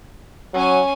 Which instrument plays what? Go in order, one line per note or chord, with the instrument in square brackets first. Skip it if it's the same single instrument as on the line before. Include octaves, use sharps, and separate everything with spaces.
[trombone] F#3 [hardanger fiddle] C#4 G#5